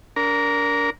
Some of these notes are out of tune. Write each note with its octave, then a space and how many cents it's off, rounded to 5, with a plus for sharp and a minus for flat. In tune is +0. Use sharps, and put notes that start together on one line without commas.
D4 -30 A#4 +0